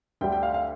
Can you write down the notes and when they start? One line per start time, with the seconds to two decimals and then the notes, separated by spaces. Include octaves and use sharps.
0.21 D2 D3 G3 D4 G5
0.32 G5
0.43 F5
0.54 F5